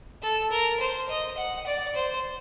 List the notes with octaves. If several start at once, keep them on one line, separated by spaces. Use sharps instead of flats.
A4
A#4
C5
D#5
F#5
D5
C5